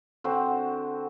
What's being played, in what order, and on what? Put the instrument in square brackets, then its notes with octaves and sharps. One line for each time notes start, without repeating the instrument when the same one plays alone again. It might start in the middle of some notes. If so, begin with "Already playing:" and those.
[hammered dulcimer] D3 C4 F#4 C5